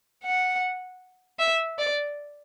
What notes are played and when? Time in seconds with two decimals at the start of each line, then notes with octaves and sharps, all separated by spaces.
0.24 F#5
1.39 E5
1.78 D5